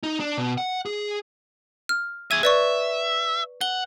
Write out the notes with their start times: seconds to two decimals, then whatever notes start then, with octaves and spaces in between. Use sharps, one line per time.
0.03 D#4
0.20 D4
0.38 B2
0.58 F#5
0.86 G#4
1.89 F6
2.31 G#4 E5 G#6 D#7
2.43 B4 D5 E5 C#6
3.61 F#5 G7